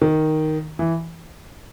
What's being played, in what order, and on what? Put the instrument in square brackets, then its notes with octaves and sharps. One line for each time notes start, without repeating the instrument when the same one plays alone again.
[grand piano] D#3
E3